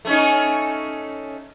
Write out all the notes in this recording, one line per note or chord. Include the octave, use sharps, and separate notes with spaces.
A3 C#4 D#4